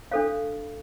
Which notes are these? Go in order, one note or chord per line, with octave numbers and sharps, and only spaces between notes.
D4 A4 C5 F5